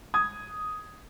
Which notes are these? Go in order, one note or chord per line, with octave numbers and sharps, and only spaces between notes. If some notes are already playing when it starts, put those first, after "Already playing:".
D#6 G#6